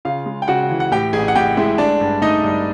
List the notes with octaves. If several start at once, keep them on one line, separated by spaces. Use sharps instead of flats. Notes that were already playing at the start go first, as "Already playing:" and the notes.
C#3 F4 F5
G#3
G5
C#3 F#4 F#5
E3
F#5
A2 G4 G5
A1 G#4 G#5
F#5
A2 G4 G5
G#3 E4 E5
A3 D4 D5
G2
A3 D#4 D#5
G2